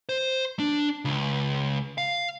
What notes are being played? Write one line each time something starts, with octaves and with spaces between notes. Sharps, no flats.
C5
D4
C#2
F5